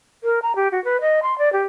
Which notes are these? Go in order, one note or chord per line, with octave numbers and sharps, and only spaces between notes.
A#4
A#5
G4
F#4
B4
D#5
C6
D5
G4